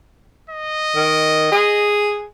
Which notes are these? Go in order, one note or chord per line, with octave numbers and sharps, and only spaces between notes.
D#5
D#3
G#4